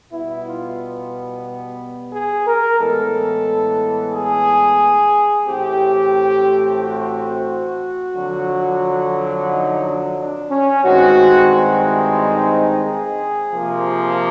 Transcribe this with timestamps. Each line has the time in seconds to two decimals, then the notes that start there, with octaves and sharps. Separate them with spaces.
0.11 B2 G3 B3 E4
0.45 F4
2.12 G#4
2.47 A#4
2.80 A2 E3 G#3 B3 A4
4.13 G#4
5.48 A2 E3 A3 C4 G4
6.82 F#4
8.15 F2 D3 F#3
9.49 D#4
9.83 D4
10.17 D4
10.51 C#4
10.84 G2 D#3 G#3 C4 F#4
11.85 E4
12.19 D#4
12.85 G#4
13.52 C3 F3 A#3